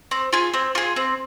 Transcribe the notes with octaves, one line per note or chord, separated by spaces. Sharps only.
C4
F4 G#4
C4
F4 G#4
C4